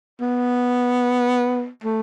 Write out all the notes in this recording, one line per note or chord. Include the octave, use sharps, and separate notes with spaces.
B3
A3